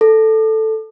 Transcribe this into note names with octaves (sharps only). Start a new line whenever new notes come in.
A4